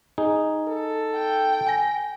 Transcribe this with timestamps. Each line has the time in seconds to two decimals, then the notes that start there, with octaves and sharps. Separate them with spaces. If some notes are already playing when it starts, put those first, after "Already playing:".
0.18 D#4 G#4
0.68 A4
1.12 G5
1.67 G#5 A#6